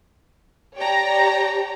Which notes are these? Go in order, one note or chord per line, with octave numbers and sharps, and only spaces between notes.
G4 C#5 D5 G5 A5 A#5